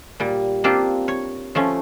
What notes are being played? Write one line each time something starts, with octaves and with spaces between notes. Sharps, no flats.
A#2 G3
A#3 C4 D4 F4 G4
C#5
F3 A3 C#4